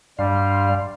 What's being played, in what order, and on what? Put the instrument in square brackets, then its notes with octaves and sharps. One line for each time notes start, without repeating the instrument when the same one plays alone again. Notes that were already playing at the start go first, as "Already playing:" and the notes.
[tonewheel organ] G2 F5 C6 [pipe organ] G3 [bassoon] D4